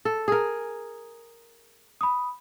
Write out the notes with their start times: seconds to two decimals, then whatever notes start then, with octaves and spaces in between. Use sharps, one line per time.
0.05 A4
0.28 G#4 A#4
2.01 B5 D#6